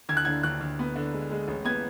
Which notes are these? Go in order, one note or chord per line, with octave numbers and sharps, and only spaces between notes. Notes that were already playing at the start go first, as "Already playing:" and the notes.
D2 G#6
F#6
D3 G#6
D2 F#6
D2
B3
D3
G#3
G#3
A1
B3 G#6